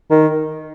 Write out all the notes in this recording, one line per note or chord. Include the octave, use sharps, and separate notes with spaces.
D#3